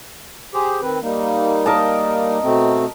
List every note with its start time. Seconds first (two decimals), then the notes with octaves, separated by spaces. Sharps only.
0.54 G4 G#4 C5
0.82 D#3 C4 B4
1.02 G3 A#3 D#4
1.66 A#4 D#5 A5
2.43 B2 A3 C4